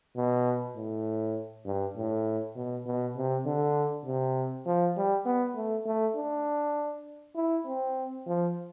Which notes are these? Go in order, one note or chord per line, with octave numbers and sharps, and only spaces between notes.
B2
A2
G2
A2
B2
B2
C3
D3
C3
F3
G3
B3
A3
A3
D4
E4
C4
F3